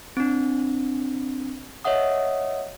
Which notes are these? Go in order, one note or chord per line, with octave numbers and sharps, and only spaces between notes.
C4 D4
C#5 D#5 E5 F#5 D#6